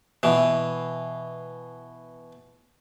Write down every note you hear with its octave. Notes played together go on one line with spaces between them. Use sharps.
B2 E3